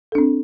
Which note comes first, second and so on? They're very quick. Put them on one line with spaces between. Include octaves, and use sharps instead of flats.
A4 D4 C4